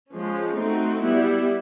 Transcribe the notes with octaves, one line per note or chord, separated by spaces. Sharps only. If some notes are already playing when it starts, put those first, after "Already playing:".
F3 G#3 C#4
A3 C4 D#4 F#4
G3 B3 E4